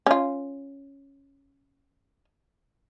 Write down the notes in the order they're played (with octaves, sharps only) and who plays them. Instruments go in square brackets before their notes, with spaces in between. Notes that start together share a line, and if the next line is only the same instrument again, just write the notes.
[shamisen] C#4 F4